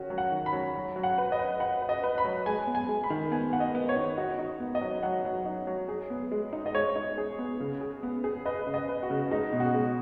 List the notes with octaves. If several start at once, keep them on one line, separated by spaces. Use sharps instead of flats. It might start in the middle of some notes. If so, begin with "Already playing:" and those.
Already playing: D#3 C#4 F#4
F#3
F#5
D#3
B5
F#3
F#3
F#3
F#5
B4
D#5
B4
B4 F#5
B4
D#5
B4
B5
F#3
G#3 G#5
B3
G#5
G#3
B5
D#3
B3 G#5
B3 F#5
D#5
B3
C#5
D#3
D#4 F#4
D#4
B3
D#5
F#3
F#3 F#5
F#3
D#4
F#3
G#4
B3
G#3
D#4
D#5
G#3 C#5
D#4
G#4
B3
C#3
G#4
B3
G#4
B4 D#5
C#3
D#5
B4
F#4
C#3
G#3 D#4
B2
F#4
G#3